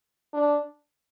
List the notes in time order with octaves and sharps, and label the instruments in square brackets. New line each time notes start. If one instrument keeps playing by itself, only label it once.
[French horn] D4